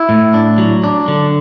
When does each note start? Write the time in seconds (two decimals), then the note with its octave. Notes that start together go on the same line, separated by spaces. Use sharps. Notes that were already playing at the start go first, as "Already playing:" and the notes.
Already playing: E4
0.09 A2
0.34 D4
0.58 F#3
0.84 D4
1.08 D3